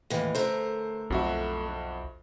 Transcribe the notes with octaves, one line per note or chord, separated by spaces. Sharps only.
D#2 A2 E3
D3 A3 A#4 C5
B1 F2 F#4 E5